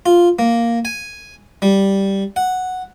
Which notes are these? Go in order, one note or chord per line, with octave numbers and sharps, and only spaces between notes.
F4
A#3
G#5
G3
F#5